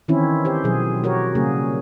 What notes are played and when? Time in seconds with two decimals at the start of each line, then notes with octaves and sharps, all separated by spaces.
0.08 D#3 E3 C4 C#4 E4
0.45 G4 C5
0.64 B2 F3 F#3 G#4
1.04 F#4 G4 A#4 C#5
1.35 C#3 G3 A#3 C#4 G#4